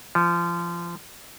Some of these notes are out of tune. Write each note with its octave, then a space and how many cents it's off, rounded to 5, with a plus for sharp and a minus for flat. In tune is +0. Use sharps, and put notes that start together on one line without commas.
F3 -25